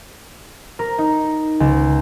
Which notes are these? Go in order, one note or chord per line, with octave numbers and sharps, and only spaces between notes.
A#4
D#4
C#2